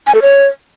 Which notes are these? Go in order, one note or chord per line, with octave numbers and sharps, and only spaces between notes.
G#5
A4
C#5